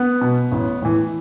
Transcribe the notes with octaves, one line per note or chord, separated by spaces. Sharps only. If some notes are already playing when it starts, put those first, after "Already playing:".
Already playing: B3
B2
A1
A2 E3